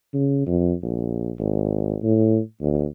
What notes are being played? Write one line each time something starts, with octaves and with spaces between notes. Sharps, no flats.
C#3
F2
A#1
G#1
A2
D2